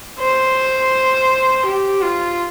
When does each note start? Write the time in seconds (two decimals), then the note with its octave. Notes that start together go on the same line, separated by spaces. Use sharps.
0.20 C5
1.65 G4
2.02 F4